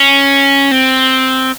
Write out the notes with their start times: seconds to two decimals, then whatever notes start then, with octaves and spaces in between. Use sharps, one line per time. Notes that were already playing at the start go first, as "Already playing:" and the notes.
Already playing: C#4
0.71 C4